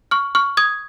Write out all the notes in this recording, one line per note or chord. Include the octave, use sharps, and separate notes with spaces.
C#6 F6
C#6 F6
D#6 G#6